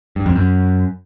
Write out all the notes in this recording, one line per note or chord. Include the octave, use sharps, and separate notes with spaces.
G2
F2
F#2